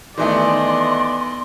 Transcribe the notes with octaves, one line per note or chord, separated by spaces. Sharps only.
D#3 E3 A3 B3 D5 D#5 C6